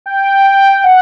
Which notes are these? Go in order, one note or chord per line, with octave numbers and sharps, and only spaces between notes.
G5
G5
F#5